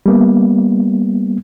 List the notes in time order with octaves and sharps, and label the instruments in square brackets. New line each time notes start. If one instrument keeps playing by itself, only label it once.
[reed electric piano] G3 A#3 B3